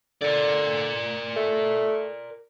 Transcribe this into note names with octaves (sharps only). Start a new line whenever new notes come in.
D3 A#4 D5
A3